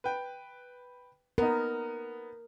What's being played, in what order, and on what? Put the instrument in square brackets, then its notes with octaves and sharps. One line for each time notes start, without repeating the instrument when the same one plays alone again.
[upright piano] B4 G5
[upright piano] B3 D#4 [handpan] A#4